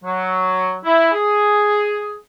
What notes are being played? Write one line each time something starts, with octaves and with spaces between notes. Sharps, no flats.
F#3
E4
G#4